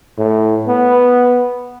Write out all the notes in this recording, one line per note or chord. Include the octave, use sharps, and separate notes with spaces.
A2
B3